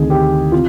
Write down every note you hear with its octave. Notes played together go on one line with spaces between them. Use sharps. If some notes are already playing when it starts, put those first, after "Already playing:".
Already playing: D2 C3 D#3 G#4
G4
C3 F4